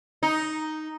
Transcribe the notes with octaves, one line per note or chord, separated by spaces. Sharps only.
D#4